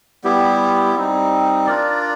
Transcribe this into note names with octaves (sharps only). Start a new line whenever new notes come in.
G3 B3 E4 G4
G3 C4 D#4
D4 F4 A#4 D5